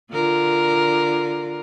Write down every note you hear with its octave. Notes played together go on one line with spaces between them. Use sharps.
D3 F4 A#4